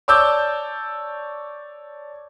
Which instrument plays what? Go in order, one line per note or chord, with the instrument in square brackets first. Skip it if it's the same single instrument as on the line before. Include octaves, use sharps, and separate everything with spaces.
[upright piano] C#5 D5 A5 D6 E6 G6